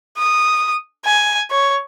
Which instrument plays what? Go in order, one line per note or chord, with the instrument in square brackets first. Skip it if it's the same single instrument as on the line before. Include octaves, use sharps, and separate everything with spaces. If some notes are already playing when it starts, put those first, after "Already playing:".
[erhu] D#6
G#5
C#5